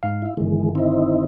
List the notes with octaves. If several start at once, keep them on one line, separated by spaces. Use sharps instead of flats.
G#2 F5
E4
G1 D#3 E3 G#3
C4 D#4 E4